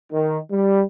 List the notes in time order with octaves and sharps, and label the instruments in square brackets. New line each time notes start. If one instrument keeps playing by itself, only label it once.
[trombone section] D#3
G3